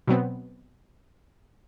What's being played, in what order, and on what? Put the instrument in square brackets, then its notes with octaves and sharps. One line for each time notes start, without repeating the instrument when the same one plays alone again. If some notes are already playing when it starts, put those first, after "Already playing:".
[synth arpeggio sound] B2 F#3 B3 C4